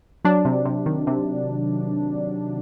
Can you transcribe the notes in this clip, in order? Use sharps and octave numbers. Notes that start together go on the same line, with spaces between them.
F#3 D4
C3
C3
D#3
C3